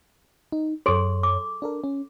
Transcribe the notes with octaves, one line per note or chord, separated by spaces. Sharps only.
D#4
F#2 G#4 A4 C#5 C6
D6
D4 A4 A#4
C#4